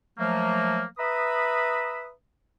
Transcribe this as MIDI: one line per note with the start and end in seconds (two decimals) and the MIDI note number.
0.17 0.83 53
0.17 0.83 54
0.17 0.83 57
0.17 0.83 58
0.98 2.09 71
0.98 2.09 76
0.98 2.09 82
0.98 2.09 83
0.98 2.09 87